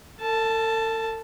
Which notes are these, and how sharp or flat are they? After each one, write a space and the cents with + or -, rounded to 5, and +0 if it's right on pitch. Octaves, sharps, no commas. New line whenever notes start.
A4 +40 A5 +0